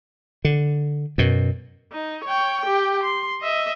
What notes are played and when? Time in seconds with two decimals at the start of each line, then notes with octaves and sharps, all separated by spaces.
0.45 D3
1.18 F#2 B2
1.92 D#4
2.24 C#5 G5
2.61 G4 G5
3.03 C6
3.41 D#5 E5